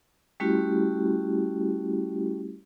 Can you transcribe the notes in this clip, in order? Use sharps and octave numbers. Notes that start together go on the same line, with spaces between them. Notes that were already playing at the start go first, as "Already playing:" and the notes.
G3 A3 C#4 E4 F#4 G4